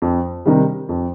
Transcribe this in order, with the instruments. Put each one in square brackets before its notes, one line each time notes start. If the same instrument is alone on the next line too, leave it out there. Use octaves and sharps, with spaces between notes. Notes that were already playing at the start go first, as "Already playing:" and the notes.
[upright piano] F2
C3 D#3 G3
F2